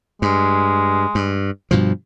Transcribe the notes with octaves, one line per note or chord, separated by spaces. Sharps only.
G2 G#3
G2
G2 B2 F3